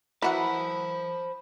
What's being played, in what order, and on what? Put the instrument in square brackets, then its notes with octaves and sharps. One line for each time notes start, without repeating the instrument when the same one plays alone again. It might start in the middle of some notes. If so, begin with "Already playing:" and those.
[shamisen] E3 F#4 [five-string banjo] A#4 E5 F#5 [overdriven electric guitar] C5 A5 [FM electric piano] B5